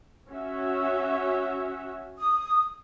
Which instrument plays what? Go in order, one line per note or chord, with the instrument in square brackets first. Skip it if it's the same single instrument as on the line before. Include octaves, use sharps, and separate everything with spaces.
[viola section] C#4 F#4 E5
[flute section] D#6